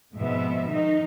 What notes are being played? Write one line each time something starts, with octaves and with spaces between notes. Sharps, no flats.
F2 G#2 B2 G#3 B3 E5
D#3 D#4